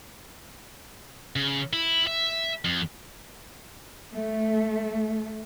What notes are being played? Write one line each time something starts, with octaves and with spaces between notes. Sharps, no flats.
C#3
E4
E5
F2
A3